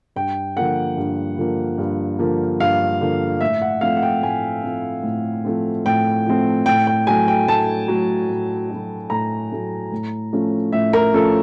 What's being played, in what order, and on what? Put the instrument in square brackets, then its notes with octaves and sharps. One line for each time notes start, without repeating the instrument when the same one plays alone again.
[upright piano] G2 G5
D3 F3 A#3 F#5
G2
D3 F3 A#3
G2
D3 F3 A#3
G2 F5
D3 F3 A#3
A2 E5
F#5
F3 A3 C4 F5
F#5
G5
A2 G#5
F3 A3 C4
A2
F3 A3 C4
A2 G5
F3 A3 C4
A2 G5
G5
F#3 A3 G#5
G5
A2 A5
F#3 A3
A2
F#3 A3
A2 A#5
F#3 A3
A2
F3 A3 C#4
A2 E5
A#4
F3 A3 C#4 A4